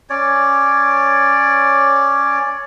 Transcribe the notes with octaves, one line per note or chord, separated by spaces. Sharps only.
C#4 C#5 D5